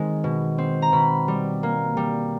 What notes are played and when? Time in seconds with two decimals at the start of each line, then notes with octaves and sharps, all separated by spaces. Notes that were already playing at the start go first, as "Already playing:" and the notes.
Already playing: D#3 G#3 C4
0.24 B2
0.58 C4
0.82 A#5
0.93 B2 B5
1.28 G3
1.63 A#3
1.97 G3